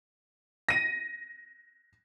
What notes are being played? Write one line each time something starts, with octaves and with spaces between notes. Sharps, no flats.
A#6 D#7